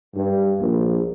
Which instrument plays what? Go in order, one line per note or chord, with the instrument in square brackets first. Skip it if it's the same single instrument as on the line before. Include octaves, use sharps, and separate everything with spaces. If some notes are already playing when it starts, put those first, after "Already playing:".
[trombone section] G2
A#1